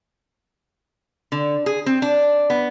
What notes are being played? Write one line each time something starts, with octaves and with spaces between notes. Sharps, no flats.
D3
G#4
C4
D4
B3